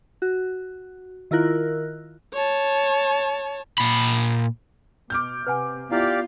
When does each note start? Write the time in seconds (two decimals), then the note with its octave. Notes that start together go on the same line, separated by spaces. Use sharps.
0.22 F#4
1.31 D#3 E4 F4 A#4 F#6
2.33 C#5 A5
3.78 A#2 B5
5.10 B2 D6 F6 G6
5.47 C3 B4 F#5 G#5
5.91 B3 E4 F4 G4 D5 E5 F5